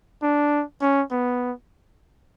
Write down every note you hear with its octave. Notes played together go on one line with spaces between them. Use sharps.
D4
C#4
B3